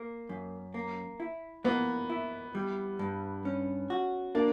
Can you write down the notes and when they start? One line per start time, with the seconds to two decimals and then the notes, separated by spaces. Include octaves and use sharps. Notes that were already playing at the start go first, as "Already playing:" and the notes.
Already playing: A#3
0.29 F#2
0.74 A#3
1.20 E4
1.64 A#3 B3
2.10 E4
2.55 G3
2.99 G2
3.45 C#4
3.90 F#4
4.35 A#3 D4